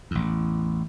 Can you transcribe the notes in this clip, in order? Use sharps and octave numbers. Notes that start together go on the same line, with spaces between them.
A1 E2